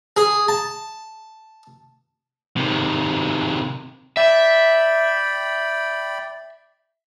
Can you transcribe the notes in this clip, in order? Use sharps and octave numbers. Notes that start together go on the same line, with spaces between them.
G#4
A5
C3 D#3
D5 E5 G5 B5